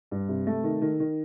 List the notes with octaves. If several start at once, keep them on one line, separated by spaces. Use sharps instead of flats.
G2
C3
A3
D#3
D#3
D#3